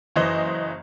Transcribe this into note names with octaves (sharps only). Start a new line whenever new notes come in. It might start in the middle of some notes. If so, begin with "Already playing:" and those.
F#1 E3 C5 D#5